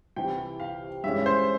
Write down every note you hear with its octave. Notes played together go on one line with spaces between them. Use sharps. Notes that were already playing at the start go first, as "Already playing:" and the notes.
C2 C3 E3 G5
F5
G2 E3 G#3 C#4 E5
C5